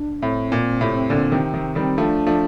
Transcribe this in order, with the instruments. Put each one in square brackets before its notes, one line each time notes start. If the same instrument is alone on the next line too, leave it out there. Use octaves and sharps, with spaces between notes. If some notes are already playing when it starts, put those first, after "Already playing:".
Already playing: [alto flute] D4
[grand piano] A2 [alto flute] C4
[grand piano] A#2
A2 C3
A#2 D3
C3 D#3
C3 D#3
D#3 G3
[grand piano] F3 A3 [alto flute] D4
[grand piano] F3 A3